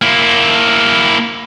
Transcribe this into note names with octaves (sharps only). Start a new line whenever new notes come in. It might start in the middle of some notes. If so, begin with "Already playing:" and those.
A#3 E4